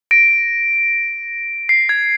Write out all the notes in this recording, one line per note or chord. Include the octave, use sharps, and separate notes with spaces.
A#6 D7
C7
G#6